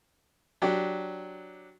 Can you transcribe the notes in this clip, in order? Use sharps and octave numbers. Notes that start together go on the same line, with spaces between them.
F#3 D4 G4